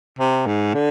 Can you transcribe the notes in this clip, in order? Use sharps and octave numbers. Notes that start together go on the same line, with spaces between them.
C3
G#2
D3